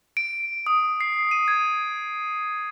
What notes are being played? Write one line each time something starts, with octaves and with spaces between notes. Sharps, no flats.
D7
D#6
C7
D#7
G#6